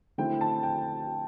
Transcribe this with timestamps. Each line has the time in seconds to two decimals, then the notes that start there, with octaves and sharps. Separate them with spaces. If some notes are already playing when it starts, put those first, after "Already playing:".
0.18 D3 A3 C4 E4 G5
0.41 A5
0.63 G5